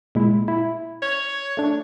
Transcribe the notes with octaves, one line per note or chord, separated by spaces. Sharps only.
A#2 G#3 E4
E4
C#5
A3 D4